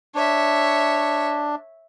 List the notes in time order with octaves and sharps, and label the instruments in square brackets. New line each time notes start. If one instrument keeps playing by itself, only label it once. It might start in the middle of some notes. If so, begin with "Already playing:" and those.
[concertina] D4 [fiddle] C#5 E5